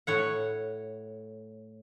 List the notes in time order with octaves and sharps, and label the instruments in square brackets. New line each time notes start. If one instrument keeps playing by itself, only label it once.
[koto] A2 C#5 F#5